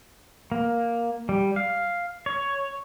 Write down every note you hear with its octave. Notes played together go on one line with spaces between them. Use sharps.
A#3
G3
F5
C#5